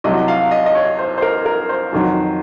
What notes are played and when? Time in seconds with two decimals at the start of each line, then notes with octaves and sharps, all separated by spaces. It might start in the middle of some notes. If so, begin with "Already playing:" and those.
0.04 C2 C3 F#3 D#5
0.28 F5
0.51 D#5
0.66 D#5
0.75 C#5
0.99 C5
1.18 C5
1.22 A#4
1.46 A#4
1.69 C5
1.93 F2 D#3 F#3